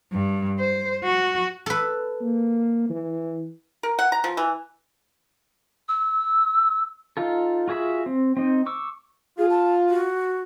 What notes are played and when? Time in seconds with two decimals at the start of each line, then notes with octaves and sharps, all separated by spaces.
0.12 G2
0.59 C5
1.04 F#4
1.66 A4 B4
2.21 A#3
2.89 E3
3.83 A#4
3.99 F#5
4.12 A#5
4.24 F3
4.37 E3
5.88 E6
7.17 D#4 F4 A4
7.68 F4 F#4 G#4 E5 B5
8.06 C4
8.37 C4 D#4
8.66 C#6 D6 E6
9.38 F4 G#4
9.50 A5
9.89 F#4